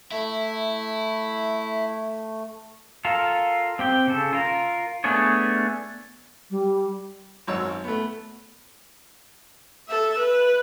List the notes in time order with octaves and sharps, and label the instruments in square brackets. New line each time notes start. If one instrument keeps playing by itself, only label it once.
[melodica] A3 [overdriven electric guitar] E4
[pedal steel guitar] F4 A4 A#4 F5
C4 G4 G5
C#3 A4
F4 A#4
A3 B3 D4 G#4 C#5
[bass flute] G3
[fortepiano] G#1 F#2 C#5 E6
A3 B3
[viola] A4 E5
B4